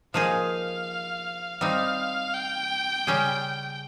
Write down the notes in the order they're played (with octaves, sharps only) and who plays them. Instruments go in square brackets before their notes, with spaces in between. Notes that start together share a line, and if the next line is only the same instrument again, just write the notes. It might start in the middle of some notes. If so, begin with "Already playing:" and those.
[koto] F3 A#3 D#4 G#4 [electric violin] F5
[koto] G3 C4 D#4 [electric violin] F5
[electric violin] G5
[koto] C#3 G3 C#4 G#4